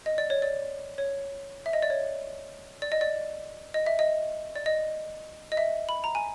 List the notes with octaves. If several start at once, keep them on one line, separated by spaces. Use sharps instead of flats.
D#5
D5
C#5
D5
C#5
E5
D#5
D5
C#5
D5
D#5
D5
D#5
E5
D#5
D5
D#5
D#5
E5
B5
A#5
G#5